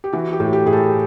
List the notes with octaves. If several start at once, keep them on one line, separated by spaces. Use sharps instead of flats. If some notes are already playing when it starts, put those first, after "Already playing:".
G4
E3 F#4
G4
A2
G4
A2 G#4
A4